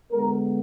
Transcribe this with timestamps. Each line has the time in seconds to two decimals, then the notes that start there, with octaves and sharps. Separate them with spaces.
0.11 D3 G#3 B3 A#4